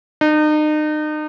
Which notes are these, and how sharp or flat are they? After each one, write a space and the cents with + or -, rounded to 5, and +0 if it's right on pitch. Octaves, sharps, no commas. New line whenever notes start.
D#4 -35